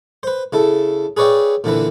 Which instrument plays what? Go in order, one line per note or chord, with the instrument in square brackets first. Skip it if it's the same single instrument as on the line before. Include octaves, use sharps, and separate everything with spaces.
[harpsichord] B4 C5
C#3 E4 A4
G#4 B4 C#5 D5 E5 G5
A#2 D3 E3 B4